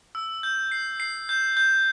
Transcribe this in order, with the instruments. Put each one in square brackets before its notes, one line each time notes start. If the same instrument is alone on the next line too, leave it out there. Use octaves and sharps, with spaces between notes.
[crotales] E6
G6
C7
C7
G6
G6